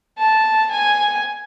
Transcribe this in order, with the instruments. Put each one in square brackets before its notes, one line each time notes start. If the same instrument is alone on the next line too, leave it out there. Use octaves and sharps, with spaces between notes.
[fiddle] A5
G#5